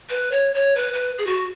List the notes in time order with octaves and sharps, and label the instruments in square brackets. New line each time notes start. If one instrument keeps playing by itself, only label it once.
[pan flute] B4
C#5
C#5
B4
B4
G#4
F#4